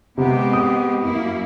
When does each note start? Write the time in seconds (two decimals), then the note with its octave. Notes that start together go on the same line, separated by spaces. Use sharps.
0.18 C3 G#3 B3 C4 G4
0.53 D#6
1.02 F#2 A#3 E4